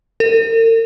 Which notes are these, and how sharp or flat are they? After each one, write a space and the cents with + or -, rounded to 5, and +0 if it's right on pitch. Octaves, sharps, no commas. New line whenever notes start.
A#4 -45